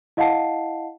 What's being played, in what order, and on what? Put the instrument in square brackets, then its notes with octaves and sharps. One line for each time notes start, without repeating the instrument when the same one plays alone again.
[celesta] E4 D#5 F5 F#5 A5 C7